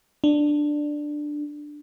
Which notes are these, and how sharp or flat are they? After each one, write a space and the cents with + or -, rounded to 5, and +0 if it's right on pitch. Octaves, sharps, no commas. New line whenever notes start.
D4 +10